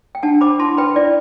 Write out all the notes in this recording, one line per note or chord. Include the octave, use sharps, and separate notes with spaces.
G5
D4 F#5 A5
C5 B5 D6
E4 A5 C6
B4 G5 B5
E4 D5